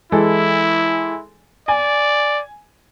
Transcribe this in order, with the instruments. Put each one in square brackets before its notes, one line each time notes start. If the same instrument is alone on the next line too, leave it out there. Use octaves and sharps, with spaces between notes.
[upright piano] E3 G#3 A4 [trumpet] E4
[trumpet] D5 [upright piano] G#5